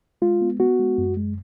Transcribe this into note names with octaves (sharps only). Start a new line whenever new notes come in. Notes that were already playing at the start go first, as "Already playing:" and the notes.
G#3 F4
B3
B3 F#4
G#3
F#2
G#3